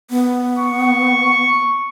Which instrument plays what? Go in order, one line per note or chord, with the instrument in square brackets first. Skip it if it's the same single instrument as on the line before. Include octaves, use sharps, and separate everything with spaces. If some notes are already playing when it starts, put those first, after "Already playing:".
[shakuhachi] B3
[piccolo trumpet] C#6